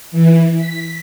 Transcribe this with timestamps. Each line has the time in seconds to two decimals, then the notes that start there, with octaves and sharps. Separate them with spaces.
0.12 E3
0.56 B6